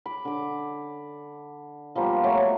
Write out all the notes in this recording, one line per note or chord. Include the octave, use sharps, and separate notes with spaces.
B5 D6
D3 D6
F3 G3 A#3 B3
F#3 A3 C#5